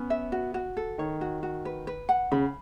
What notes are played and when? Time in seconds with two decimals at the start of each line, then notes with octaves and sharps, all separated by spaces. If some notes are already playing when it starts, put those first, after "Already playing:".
Already playing: B3 C#4
0.10 E5
0.32 F#4
0.54 F#4
0.77 A4
0.98 D#3 C#5
1.21 F#4
1.43 F#4
1.65 B4
1.87 B4
2.09 F#5
2.32 C#3 B5